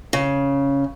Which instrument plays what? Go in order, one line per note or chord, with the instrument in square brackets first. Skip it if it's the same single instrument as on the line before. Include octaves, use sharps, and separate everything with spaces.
[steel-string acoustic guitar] C#3